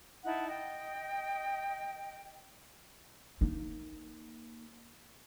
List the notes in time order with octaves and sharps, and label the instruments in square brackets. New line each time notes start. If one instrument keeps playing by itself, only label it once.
[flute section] D#4 E4 F#5 A5
D#5 G5
[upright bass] A#3 D#4